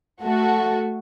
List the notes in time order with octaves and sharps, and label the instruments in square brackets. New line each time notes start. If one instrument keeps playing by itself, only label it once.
[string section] A3 F#4 A4